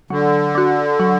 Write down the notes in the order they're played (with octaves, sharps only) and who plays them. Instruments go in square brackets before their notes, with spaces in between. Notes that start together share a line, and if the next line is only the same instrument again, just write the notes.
[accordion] D3 [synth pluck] F#3
[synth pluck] D4 F#4
F#3